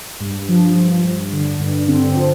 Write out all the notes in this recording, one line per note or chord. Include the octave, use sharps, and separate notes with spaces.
G2
F3
G2
G2
D3
G2
D3 C4
F3